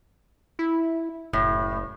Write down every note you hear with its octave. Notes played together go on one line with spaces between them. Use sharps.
E4
F#1 A2